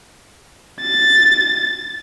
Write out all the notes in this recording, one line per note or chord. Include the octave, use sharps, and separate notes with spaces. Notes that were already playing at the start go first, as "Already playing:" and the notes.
A6